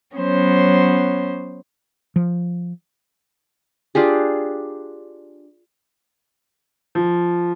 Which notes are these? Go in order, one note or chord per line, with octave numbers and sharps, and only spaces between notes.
F#3 B3 C#4 C5
F3
D4 F4 G4 G#4
F3